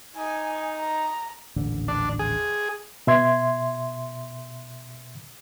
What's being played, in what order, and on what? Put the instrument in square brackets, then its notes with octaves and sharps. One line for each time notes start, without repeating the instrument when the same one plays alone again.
[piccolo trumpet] D#4 [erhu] G#5
[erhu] A#5
[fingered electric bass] D#1 A1 D3
[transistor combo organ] D4
G#4
[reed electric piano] B2 E5 C6 G#6